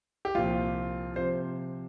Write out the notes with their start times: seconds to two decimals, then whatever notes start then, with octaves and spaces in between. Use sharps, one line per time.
0.25 G4
0.35 C2 A#2 F3 F4
1.16 C3 F3 C5